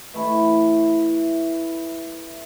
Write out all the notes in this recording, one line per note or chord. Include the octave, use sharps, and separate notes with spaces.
E3 A3 E4